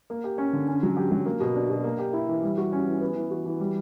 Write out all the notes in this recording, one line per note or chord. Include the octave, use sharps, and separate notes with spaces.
A#3
G4
C#4
D3
C#4
F#3
G4
F#3
A#3
B2
D4
B2
A#3
G4
E4
E3
G3
F#4
C#4
E3
B3
E3
F#4
E3
G3